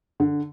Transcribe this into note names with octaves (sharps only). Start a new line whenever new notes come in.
D3